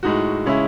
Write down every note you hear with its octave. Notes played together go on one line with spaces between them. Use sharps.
A2 G#3 D#4 F#4
C#3 G#3 C#4 E4